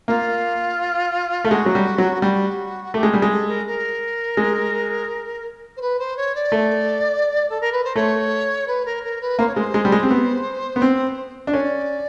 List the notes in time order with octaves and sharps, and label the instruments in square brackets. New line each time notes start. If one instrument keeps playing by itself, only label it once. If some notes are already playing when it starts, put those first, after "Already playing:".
[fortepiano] A#3 [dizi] F4
[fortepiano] A3
[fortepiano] G#3 [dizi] F#4
[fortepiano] F#3
G3
F#3
[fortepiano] G3 [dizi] F#4
[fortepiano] A3 [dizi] G4
[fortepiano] G#3
[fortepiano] G3 [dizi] G#4
[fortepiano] G#3
[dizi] A4
A#4
A#4
[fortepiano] G#3
[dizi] C5
B4
C5
C#5
D5
[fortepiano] A3
[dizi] A4
A#4
B4
C5
[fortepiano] A3 [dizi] C#5
[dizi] B4
A#4
A#4
B4
[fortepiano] A#3 [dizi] C5
[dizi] C#5
[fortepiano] G#3 [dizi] C5
[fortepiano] G#3
G3
G#3
C4
B3
B3
C4
D4
[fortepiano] C#4 [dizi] D5